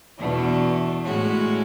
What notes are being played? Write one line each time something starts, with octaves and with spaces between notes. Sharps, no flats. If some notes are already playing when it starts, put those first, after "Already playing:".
E2 B2 A3 D4
A2 G#3 C#4 F#4